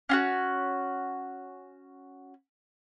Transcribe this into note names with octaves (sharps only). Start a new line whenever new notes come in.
C#4 F4 F#4